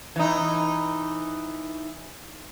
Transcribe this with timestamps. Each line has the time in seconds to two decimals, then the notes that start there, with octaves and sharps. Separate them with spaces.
0.16 E3 D#4